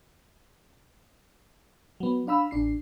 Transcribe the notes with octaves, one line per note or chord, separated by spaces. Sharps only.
F#3 B3
D4 F5 B5 E6
A1 D4 C7